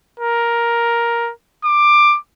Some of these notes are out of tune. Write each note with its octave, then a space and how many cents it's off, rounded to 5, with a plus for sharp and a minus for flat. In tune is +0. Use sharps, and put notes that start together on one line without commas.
A#4 +10
D6 +15